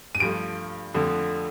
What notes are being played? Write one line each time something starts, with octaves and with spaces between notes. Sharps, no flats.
D#7
G2 F3 A3 D7
F2 D3 F3 A3